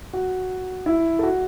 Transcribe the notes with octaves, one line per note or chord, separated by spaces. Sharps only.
F#4
E4
A4
F#4